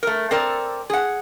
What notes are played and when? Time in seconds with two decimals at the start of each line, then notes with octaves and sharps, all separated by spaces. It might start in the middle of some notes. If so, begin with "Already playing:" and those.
0.03 A3 A#4
0.31 C4 A4 A#4 D5
0.90 G#4 F#5